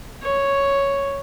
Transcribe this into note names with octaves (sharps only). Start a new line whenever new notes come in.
C#5